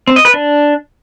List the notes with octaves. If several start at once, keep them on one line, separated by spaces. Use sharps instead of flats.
C4
D#5
B4
D4